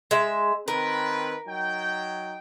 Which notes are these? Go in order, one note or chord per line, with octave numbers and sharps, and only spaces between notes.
G#3 E5
D#3 C4 A#4 B4
F#3 D#4 G5